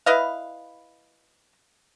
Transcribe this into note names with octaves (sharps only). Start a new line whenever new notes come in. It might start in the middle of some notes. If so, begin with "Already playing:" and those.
E4 B4 D#5 F5